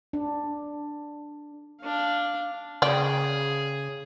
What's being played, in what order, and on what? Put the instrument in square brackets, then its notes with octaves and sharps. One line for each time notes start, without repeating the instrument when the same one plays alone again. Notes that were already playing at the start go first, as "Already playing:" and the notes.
[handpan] D4
[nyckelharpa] D4 F5
[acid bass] C#3 [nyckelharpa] G#4 [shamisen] D5 G5